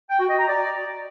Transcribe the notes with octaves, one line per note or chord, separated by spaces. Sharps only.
G5
F#4
D#5
A#5
D5